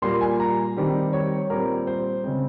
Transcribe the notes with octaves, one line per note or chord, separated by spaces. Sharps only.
A#2 G3 A#3 C6
G#5
A#5
D#3 G3 C4
C#5
A#2 G3 C4 A#4
C5
C#3 G#3 C4